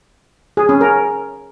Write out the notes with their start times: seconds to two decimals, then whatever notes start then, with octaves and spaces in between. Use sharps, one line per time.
0.57 G#4
0.69 C#4
0.81 A#4